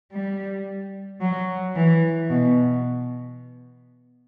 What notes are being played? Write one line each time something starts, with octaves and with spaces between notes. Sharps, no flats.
G3
F#3
E3
B2